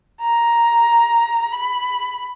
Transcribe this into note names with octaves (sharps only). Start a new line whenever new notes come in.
A#5
B5